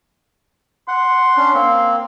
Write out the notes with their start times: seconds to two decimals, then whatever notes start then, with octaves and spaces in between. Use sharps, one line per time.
0.88 F#5 C6
1.37 C#4 D4
1.54 A#3 C4